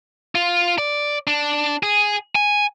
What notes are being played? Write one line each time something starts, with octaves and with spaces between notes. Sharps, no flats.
F4
D5
D4
G#4
G#5